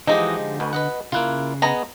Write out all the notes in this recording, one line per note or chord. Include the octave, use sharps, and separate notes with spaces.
E3 F3 G#3 D#4 F#4 G4 D#5
D3
D2 B2
B4 D#5 F#5
C#3 A#3 E4 F4 F#6
B3 G#4 D#5 A#5